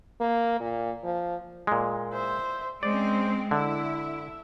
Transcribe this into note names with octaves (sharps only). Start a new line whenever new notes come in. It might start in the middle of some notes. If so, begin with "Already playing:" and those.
A#3
A#2
F3
A#2 G#3
C5 E5
G#3 C4 C#4 C5 D5
D3 E4 E5